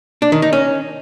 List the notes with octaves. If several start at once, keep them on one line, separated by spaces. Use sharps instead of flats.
D4
D#3
D#4
C#4